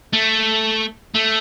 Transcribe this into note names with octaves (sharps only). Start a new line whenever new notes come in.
A3
A3